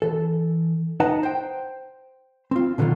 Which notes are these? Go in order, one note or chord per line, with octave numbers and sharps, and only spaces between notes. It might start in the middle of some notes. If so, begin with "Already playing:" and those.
E3 A4
D#4 B4 D#5 F#5 A5 A#5
C5 G5
C4 F4
B2 D3 D#3 F#3 F4